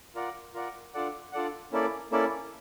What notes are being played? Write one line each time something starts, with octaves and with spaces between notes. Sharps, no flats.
F4 A#4 D5 F#5
F4 A#4 D5 F#5
D4 F4 A4 D5 F#5
D4 F4 A4 D5 F#5
A#3 C#4 E4 A4 D5
A#3 C#4 E4 A4 D5